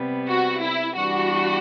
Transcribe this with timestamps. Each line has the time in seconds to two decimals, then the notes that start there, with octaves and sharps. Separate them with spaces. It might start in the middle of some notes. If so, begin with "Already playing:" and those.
Already playing: C3 G3 B3
0.29 F#4
0.62 E4
0.96 E3 G3 B3 D4 F#4